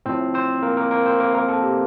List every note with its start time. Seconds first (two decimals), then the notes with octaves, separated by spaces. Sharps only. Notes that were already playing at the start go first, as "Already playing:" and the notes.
0.06 A2 F3 C4 C5
0.34 C4 C5
0.62 A#3 A#4
0.77 A#3 A#4
0.91 A#3 A#4
1.06 C4 C5
1.20 A#3 A#4
1.34 A#3 A#4
1.49 A4
1.63 G4